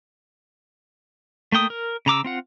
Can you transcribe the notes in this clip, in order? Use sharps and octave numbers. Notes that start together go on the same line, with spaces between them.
A3 A#3 G5 D#6
A#4
C#3 A#5 D6 E6
C4 F4 F#5